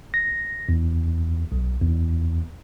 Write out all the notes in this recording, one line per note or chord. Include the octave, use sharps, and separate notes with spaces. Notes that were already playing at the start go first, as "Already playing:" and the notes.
A#6
E2
B1
E2